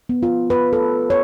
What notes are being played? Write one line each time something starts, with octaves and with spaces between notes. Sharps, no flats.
B3
F4
B4
A4
C#5